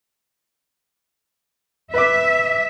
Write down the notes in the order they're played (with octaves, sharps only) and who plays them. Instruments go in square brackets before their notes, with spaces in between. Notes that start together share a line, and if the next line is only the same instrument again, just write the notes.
[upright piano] B4 D6 [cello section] E5